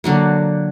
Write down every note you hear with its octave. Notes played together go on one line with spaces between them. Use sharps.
D3 F#3 A#3